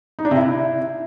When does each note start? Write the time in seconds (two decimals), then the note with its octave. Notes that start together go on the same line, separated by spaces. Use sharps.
0.19 D#4
0.25 D4
0.31 C3
0.37 E4